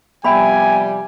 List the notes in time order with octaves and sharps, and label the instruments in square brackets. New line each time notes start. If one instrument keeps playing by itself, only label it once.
[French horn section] C3 F3 G3 [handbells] B3 E5 G5 [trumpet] G#5 [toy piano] B5